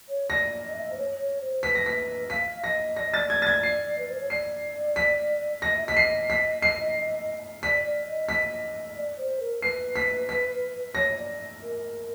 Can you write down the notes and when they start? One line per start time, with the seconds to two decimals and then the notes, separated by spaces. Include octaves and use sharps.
0.08 C#5
0.30 D5 A#6
0.63 D#5
0.73 E5
0.81 D#5
0.91 C5
0.97 C#5
1.18 C#5
1.41 C5
1.63 B4 B6
1.75 A#6
1.86 B6
2.30 F5 B6
2.63 D#5 A#6
2.96 D5 A#6
3.05 D#5
3.14 D5 A6
3.30 G#6
3.42 A6
3.47 G#6
3.63 C7
3.98 B4
4.08 C5
4.19 C#5
4.30 D5 C7
4.96 B6
5.62 D#5 A#6
5.75 E5
5.85 D#5 B6
5.97 C7
6.30 B6
6.62 C7
7.63 D5 B6
7.85 D5
8.06 D#5
8.29 D#5 B6
8.95 D5
9.18 C5
9.40 A#4
9.62 B4 C7
9.96 B6
10.29 B6
10.95 C#5 A#6
11.17 D5
11.62 A#4